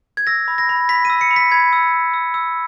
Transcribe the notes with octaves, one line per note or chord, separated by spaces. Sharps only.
G#6
E6 A#6
B5
A#6
B5
B5 B6
E6 D#7
C#7
B5
B6
B5 G#6
E6
E6
E6
E6